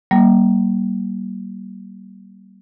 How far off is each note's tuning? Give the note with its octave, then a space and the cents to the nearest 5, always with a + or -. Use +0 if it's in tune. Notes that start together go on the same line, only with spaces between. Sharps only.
G3 -25 A#3 +20